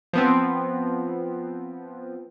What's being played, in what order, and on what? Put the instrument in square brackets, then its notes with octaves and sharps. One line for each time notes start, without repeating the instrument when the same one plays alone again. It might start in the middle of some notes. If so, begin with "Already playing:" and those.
[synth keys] F3 B3 C4